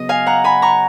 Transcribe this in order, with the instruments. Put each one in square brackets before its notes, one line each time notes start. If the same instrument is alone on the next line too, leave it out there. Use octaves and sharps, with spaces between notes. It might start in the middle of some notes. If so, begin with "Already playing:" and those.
Already playing: [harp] C#3 F#3 B3 D#5
F5 G#5
F#5 A#5
G#5 B5
A#5 C#6